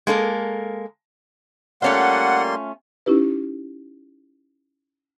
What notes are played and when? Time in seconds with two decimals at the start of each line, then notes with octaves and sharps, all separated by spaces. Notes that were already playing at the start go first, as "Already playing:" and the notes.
0.07 G#3 A#3 A4 A#4
1.82 G3 A3 A#3 C#4 F4 F#5 C6
3.06 C#4 D#4 E4 G4 B4